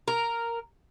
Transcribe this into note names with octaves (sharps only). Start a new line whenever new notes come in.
A#4